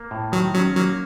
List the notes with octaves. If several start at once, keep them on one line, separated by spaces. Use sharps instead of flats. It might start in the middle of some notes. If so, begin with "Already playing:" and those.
Already playing: A#3
A2
D#3 F#3
F#3 C#4
F#3 A#3